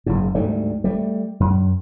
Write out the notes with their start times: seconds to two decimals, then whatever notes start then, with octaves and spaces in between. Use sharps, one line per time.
0.06 F#1 G#2
0.35 D2 G#2 G3 A3
0.84 G3 A3
1.40 F#2